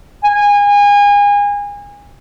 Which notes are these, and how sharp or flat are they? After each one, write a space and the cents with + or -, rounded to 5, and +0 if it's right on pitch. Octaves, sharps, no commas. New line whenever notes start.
G#5 -30